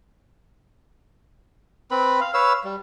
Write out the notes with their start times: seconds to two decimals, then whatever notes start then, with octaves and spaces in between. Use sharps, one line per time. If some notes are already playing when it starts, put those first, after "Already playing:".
1.91 C4 B4 B5
2.21 F5
2.34 B4 C#5 F5 E6
2.64 G3